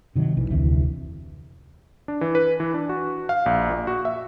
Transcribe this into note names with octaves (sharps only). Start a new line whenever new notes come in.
C3 D#3 F3 F#3
B1 E3
F1 D2 C3 E3
D4
E3
B4
E3
D4
F#4
F5
A#1
A#2
F#4
E5